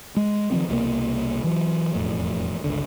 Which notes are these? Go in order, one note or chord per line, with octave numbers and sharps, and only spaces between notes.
G#3
D#3 F3 A3 C4
C2 B2 G3 A#3
E3 F#3
E1 F2 A2
G1 C#2 D3